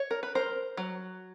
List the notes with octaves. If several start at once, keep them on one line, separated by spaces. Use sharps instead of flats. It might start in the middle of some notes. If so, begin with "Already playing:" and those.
Already playing: C#5
A#4
B4
A#4 C5
F#3